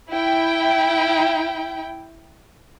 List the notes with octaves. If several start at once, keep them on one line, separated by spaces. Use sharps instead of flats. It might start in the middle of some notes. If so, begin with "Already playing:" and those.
E4 G5